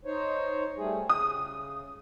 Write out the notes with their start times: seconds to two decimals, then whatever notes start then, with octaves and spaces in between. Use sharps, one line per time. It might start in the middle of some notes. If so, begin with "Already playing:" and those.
0.05 D#4 C5 C#5
0.77 G3 A3 G#4
1.09 C#3 D#6